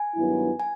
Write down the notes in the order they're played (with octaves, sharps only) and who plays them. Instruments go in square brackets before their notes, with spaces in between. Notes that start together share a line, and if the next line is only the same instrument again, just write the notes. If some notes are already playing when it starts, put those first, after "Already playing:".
Already playing: [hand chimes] G#5
[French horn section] G2 D#3 F#3 B3 E4
[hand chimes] G#5